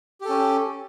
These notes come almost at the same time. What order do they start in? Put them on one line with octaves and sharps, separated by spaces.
G4 A4 C#4